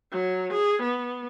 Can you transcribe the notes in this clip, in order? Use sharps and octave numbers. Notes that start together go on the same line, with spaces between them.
F#3
G#4
B3